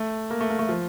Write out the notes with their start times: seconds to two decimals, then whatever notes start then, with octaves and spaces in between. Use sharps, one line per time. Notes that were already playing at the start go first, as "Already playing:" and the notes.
Already playing: A3
0.30 A#3
0.41 A3
0.50 A#3
0.59 A3
0.69 F3